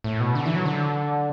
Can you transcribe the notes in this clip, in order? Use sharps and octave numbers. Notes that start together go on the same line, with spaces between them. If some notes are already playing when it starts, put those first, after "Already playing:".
A2
B2
D3
E3
F#3
D3